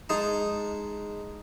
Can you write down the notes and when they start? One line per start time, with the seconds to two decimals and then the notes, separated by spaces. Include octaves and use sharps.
0.09 G#3 D#4 A5